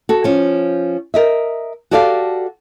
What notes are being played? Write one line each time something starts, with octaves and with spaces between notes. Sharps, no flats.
F#4 A4
F3 C#4
A#4 D#5 E5
F#4 G4 A4 D5 E5 F5